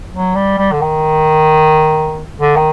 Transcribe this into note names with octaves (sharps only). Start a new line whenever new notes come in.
F#3
G3
G3
D3
D#3
D3
D#3